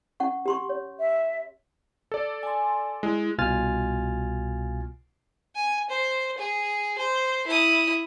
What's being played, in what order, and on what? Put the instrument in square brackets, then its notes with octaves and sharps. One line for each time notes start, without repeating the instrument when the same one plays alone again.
[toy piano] C#4 F#5 C#6
G4 C6 C#6
C#5
[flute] E5
[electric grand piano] A4 D5
[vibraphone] G#5 C6
[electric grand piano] G#3 [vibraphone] E4
[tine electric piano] C2 B2 F4 G#5 F6 A6
[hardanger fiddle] G#5
C5
G#4
C5
E4 D#6